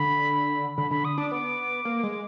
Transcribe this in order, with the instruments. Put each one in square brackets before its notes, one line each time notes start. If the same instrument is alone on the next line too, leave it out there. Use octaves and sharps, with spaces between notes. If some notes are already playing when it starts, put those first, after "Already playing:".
Already playing: [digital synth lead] D3 [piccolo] B5
[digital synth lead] D3 [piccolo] B5
[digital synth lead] D3 [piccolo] B5
[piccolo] D#6
[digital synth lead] D4 [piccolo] D6
[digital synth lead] B3 [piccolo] D6
[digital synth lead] A#3
G#3